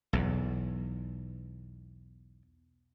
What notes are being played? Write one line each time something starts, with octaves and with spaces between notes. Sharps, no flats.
B1 E2